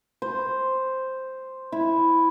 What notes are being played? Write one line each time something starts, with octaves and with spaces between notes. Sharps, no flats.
C5
E4